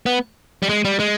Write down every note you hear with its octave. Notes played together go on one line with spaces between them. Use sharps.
B3
G3
G#3
G3
G#3